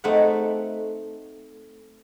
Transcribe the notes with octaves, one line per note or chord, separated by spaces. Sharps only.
A3 C4 D#4 E5 F#5